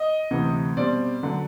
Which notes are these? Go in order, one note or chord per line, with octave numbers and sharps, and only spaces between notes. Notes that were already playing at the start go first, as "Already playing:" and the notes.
Already playing: D#5
D2 C3 E3
B2 G3 C4 D5
D3 F#3